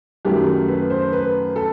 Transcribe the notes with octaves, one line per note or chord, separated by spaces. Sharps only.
F#2 D#3 F#3 A3 G4
B4
C5
B4
A4